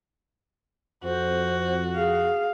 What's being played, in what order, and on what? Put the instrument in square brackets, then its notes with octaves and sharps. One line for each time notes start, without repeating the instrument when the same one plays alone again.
[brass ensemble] F2 [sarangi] F#4 [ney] C5
[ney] G#4 [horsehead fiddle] F5